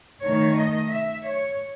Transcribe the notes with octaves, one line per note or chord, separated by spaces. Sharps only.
D#3 A3 C#5
D#5
E5
C#5